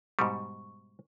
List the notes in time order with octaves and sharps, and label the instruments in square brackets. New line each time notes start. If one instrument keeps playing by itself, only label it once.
[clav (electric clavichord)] G#2 B2 G3 [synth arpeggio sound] C#6